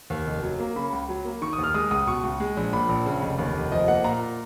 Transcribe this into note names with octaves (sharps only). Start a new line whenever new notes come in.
D#2
F1
F#3
A#3
C#3 B5
C#2
F#3
A#3
D#3 C#6
D#6
D#2
F6
G#3 D#6
C#2 D#6
B2 C#6
C#2
G#3
A#1
A#2 B5
A#1
C#3
F1
D#2
F1
F3 D#5
A#3 F#5
A#2 A#5